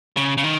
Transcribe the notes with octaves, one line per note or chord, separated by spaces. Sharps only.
C#3
C#3
D#3